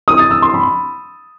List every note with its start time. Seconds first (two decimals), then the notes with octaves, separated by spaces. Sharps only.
0.08 D#6
0.19 A6
0.31 E6
0.42 C6
0.54 B5